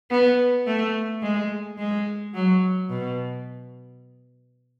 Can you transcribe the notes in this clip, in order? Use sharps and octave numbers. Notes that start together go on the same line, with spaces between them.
B3
A3
G#3
G#3
F#3
B2